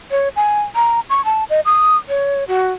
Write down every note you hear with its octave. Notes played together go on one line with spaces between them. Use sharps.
C#5
G#5
A#5
C#6
A5
D#5
D#6
C#5
F#4